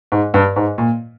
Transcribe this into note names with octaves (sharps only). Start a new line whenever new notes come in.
G#2
G2
G#2
A#2